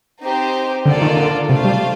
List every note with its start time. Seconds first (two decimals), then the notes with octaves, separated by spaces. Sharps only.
0.22 C4 D#4 G4 C5
0.86 D3 A#3 F4 A4 D5
1.02 D#3
1.17 D3
1.48 C3 A3 D4 F4 C5 F5
1.64 G3